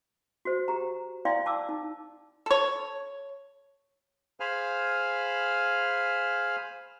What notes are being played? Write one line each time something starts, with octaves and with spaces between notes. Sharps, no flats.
F#4 C5
G4 A#5
E4 D5 F5 G5 C6
A5 D6 E6
D#4
A4 C#5
G#4 C5 F5 G#5 B5 F6